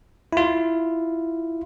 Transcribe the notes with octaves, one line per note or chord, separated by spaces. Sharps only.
E4 F4